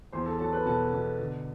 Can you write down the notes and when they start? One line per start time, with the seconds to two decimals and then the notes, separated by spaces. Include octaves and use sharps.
0.12 E2 C5 C6
0.26 A4 A5
0.39 F#3 A4 A5
0.53 B4 B5
0.66 B2 A4 A5
0.93 B2
1.19 D3